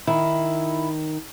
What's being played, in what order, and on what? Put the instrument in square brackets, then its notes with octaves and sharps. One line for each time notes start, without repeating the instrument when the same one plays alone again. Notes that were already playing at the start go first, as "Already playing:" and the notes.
[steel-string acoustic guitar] D#3 [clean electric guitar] E4